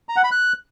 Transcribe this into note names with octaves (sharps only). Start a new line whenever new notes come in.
A#5
F#5
B5
F#6